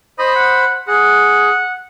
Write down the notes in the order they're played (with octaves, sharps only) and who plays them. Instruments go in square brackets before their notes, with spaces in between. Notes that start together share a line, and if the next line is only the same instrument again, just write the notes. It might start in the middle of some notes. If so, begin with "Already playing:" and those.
[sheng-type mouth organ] C5 B5 [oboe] D#5
[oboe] F#5
[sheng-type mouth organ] G#4 [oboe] F#5